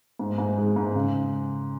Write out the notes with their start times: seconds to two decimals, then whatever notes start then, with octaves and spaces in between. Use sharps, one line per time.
0.19 G#2
0.38 G#2
0.58 G#3
0.76 G#2
0.95 C#3